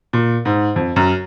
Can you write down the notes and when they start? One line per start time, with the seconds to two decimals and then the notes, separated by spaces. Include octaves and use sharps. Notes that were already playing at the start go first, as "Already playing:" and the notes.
0.13 A#2
0.45 G#2
0.76 F2
0.96 F#2